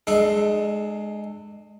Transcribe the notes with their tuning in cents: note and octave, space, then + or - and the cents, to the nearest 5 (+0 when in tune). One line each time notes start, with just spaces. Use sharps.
G#3 +10 D4 +40 A4 -10